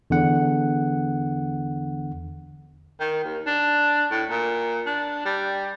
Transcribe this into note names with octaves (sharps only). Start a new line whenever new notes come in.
E2 D3 F#5
D#3
D#2
D4
A2
A#2
D4
G3